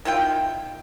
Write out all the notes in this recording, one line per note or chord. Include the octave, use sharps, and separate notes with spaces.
D#3 E4 F4 G5